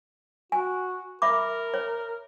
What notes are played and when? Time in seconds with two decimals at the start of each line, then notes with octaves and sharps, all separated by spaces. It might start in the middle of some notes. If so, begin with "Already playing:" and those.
0.52 F#4 G#5
1.22 A#4 E5 B5 D6
1.74 C#5